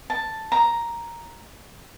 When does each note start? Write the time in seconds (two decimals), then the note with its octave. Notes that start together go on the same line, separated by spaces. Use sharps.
0.10 A5
0.52 A#5